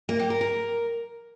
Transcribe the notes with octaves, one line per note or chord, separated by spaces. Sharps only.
A#3
G4
A#4
A#4